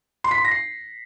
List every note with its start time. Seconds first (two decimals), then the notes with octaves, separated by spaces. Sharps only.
0.24 C6
0.31 B6
0.38 C6
0.45 A#6
0.51 C7